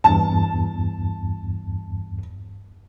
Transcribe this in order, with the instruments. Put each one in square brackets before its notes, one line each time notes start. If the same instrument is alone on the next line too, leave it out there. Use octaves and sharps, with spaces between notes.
[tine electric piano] E2 G2 [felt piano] A5